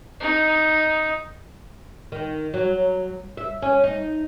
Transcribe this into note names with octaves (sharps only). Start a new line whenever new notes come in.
D#4
D#3
F#3
E5
C#4
D#4